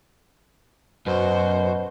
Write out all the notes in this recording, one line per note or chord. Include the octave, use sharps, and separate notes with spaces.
F#2 B2 F#4 C5